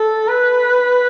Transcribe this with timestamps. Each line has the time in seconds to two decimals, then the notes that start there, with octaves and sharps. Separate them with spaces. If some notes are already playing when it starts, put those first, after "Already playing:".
Already playing: A4
0.27 B4